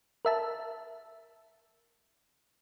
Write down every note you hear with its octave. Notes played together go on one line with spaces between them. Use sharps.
A#4 E5 A5